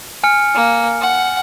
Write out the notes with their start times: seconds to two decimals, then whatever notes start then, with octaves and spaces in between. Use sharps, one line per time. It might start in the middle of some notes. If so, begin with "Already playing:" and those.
0.24 G#5 F6 C#7
0.55 A#3
1.01 F#5